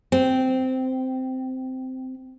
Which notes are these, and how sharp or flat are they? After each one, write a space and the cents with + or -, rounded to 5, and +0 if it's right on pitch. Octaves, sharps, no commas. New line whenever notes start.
C4 -10